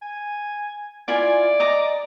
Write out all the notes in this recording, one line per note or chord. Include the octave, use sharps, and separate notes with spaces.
G#5
E4 F4 D5 G#5
D#5 A#5 D6